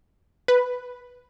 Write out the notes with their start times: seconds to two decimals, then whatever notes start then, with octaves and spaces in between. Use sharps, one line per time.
0.48 B4